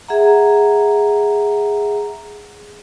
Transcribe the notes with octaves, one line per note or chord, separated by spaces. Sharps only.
G#4 E5 F#5 A#5